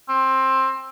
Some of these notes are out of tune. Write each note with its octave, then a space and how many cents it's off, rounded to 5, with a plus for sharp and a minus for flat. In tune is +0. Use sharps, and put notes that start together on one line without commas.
C4 +15